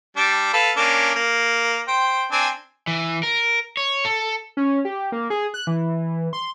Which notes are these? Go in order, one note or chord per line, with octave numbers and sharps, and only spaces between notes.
G3 D4
A4 B4 F5
A#3 C#4 D4
A#3
C5 G5
C4 D4 G#5
E3
A#4
C#5
A4
C#4
G4
A#3
G#4
F#6
E3
C6